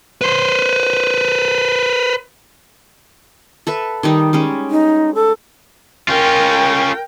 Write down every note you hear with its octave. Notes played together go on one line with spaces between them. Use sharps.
B4 C5
A4 B4 E5
D#3 G3 D#4
G3 G#3 C#4
D#4
A4
C#4 F4 A#4 G5